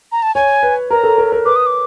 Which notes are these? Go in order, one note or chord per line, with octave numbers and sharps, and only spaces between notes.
A#5
A5
C#5 G#5
B4
A#4 A#5
A4
A#4
A#4
B4 D6
D#6
D6